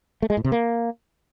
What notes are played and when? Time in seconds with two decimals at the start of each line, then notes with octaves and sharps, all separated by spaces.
0.22 A3
0.30 G#3
0.37 A2
0.44 C3
0.52 A#3